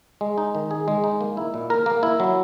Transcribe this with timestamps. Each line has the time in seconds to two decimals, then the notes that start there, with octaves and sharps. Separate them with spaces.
0.21 G#3
0.38 D#4
0.55 D#3
0.71 G#4
0.88 G#3
1.04 D#4
1.21 A#3
1.37 E4
1.54 A#2
1.70 A#4
1.86 A#3
2.03 E4
2.20 F#3